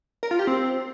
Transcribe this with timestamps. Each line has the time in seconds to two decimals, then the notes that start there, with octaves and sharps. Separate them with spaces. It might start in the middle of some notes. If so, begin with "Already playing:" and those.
0.23 A#4
0.31 F4
0.39 G4
0.47 C4